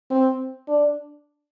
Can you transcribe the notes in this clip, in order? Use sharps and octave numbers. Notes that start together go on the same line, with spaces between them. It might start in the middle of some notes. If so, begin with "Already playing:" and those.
C4
D4